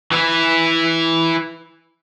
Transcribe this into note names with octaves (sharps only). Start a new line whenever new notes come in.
E3 E4